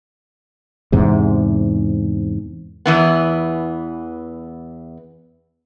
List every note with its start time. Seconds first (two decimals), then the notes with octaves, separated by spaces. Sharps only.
0.92 E2 G#2 C3
2.86 E2 E3 B3